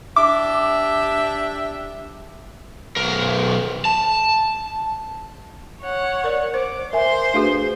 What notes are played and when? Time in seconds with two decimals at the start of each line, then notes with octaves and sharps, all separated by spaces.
0.16 D4 G4 E5 D6
2.96 B1 A#4
3.85 A5
5.81 C#5 F#5
6.24 A#4 D5
6.54 C5 D6
6.93 A#4 C5 E5 G#5 C6
7.34 A3 D4 F#4 G#4 A4 B4